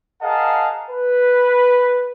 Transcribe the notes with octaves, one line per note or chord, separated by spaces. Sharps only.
G#4 A#4 D#5 F5 F#5 A5
B4